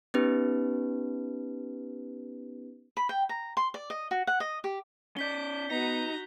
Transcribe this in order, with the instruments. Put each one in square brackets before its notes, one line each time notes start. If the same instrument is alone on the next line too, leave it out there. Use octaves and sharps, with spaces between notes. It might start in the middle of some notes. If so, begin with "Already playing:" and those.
[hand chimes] B3 C#4 D#4 G4 B4
[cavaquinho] B5
G5
A#5
C6
D5
D#5
F#4
F#5
D#5
G4
[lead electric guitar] C#4 D5 [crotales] G6 B6 G7
[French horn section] B3 [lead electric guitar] D#4 [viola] F#4 A#5